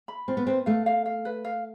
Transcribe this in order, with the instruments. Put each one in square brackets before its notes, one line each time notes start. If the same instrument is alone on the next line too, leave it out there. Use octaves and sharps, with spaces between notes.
[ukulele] B5
[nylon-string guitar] C4 [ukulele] F4
[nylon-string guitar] B3
[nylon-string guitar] C4 [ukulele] B4
[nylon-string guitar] A3 [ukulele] F5
[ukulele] F5
F5
B4
F5